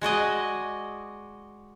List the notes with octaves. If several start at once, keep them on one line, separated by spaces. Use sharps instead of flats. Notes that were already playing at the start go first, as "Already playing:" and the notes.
G#3 F#4 D5 D#5